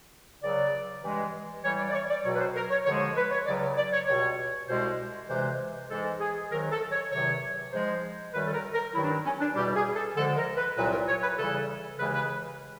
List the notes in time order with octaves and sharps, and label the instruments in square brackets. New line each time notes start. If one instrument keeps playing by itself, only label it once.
[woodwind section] C#2 C#3 F#3 D5
G2 E3 G#3
A2 E3 G3 C#5
D5
D5
C#5
D5
C#2 B2 F#3 C#5
B4
C5
A#4
C#5
D#2 D3 F3 G#3 C#5
C#5
B4
C#5
C#2 C#3 F#3 D5
D5
C#5
C#2 B2 G3 C#5
C2 B2 G#3 C5
D2 C3 E3 G#3 C5
G#2 E3 G#3 A4
G#4
G#2 D#3 F#3 A#4
A4
C#5
E2 C3 D#3 F#3 C#5
G#2 F3 G#3 C5
F#2 D#3 G3 B4
A4
A#4
A#4
G2 D#3 F#3 E4
D4
D#4
C#4
D4
E2 B2 G3 G4
G#4
A4
D2 D3 F3 G#3 A4
A#4
B4
C2 A#2 F#3 B4
A#4
C#5
B4
E2 C#3 E3 G3 A4
D#2 C#3 E3 G#3 B4
B4